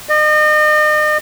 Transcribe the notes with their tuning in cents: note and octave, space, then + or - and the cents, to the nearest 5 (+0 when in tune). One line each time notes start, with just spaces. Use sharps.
D#5 -40